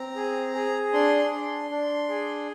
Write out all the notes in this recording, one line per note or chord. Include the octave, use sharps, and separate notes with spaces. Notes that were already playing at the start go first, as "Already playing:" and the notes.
Already playing: C4 A#5
G#4
G#4
D4 C6
D4
D4
G#4